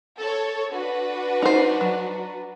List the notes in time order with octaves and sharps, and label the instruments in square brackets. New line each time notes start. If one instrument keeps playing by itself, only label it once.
[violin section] A4 C#5
D4 F#4 B4
[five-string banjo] D#4 C5
F#3